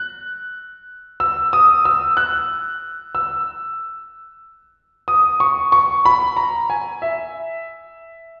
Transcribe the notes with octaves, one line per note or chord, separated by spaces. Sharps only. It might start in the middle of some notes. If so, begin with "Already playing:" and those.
Already playing: F#6
E6
D#6
E6
F#6
E6
D#6
C#6
C#6
B5
A#5
G#5
E5